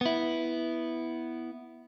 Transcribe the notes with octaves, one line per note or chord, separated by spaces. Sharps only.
B3 E4